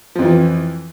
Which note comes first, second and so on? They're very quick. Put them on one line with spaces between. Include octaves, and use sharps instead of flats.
F3 F2 E3